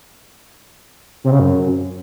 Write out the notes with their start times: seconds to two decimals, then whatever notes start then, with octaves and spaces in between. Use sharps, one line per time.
1.24 C3
1.32 C#3
1.40 F#2